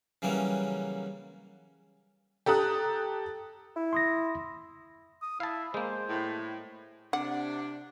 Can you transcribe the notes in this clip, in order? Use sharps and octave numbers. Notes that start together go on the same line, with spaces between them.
C#3 E3 F#3 G3 A#3 C#4
G4 A4 A#5 D#6 F#6
E4
C6 D#6 A#6
D#6
E4 F5 A5
G#3 A#3 C5
A2
C3 D4 F#5